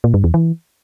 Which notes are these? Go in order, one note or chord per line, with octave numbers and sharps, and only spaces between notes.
A#2
G2
E2
E3